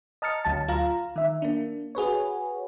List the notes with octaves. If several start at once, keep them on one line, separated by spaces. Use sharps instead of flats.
D#5 A5 A#5 F6 A6 C#7
D2 F#3 A5
F4 F5 A#5
D#3 E5
A#3 D4
F#4 G#4 B4 C#5